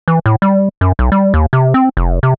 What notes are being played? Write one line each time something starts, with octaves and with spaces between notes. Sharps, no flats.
E3
A2
G3
F#2
B1
G3
D#2
C3
C4
F1
C3